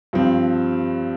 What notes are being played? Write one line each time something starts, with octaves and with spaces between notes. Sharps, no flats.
G2 F3 C4